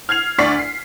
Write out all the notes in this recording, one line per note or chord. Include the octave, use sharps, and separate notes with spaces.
F6 G#6 C7 F7
D2 D4 D5 C#6 B6
C7